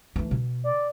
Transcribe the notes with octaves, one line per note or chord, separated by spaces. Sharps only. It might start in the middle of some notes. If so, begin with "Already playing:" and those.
E3 A3
B2
D5